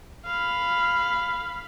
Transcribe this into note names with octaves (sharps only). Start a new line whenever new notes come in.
F5 B5